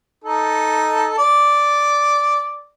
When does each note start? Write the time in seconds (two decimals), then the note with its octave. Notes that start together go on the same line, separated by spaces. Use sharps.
0.24 D#4 A4
1.18 D5